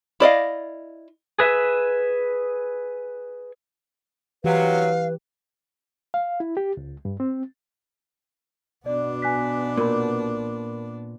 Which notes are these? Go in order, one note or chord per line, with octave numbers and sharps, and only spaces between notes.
E4 D5 D#5 F5
G#4 B4 E5
C3 E3 F#3 G4 B4 F5
F5
E4
G4
C#2
G2
C4
B2 B3 D4 D5
G#5 F#6 B6
A#2 A#4 B5